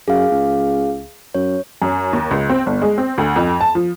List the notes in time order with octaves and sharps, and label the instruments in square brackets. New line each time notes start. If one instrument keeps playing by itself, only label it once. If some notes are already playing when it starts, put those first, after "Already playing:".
[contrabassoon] F#2 [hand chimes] G#4 F5
[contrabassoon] C#2
[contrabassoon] F#2 [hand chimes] C#5
[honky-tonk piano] F#2
D#2
C#2
C4
G1
G#3
C4
D2
F2
A5
F3